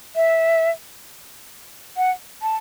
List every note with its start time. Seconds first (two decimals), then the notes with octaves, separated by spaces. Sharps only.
0.16 E5
1.97 F#5
2.42 A5